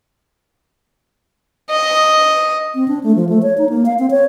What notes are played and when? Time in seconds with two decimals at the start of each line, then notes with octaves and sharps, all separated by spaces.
1.71 D#5
2.75 C4
2.88 D4
3.03 A3
3.16 F3
3.29 A3
3.42 C#5
3.58 D#4
3.69 A#3
3.86 F5
3.99 C4
4.10 C#5